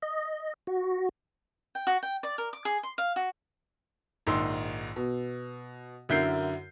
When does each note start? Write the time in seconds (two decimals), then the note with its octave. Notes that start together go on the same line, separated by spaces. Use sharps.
0.02 D#5
0.67 F#4
1.75 G5
1.87 F#4
2.03 G5
2.23 D5
2.38 A#4
2.53 D6
2.65 G#4
2.83 C6
2.98 F5
3.16 F#4
4.27 A#1 G#2 D#3 C6 E6
4.96 B2
6.09 F#2 D3 E4 A#4 G6 C7